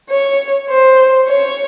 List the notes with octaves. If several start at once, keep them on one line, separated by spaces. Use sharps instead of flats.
C#5
C5
C#5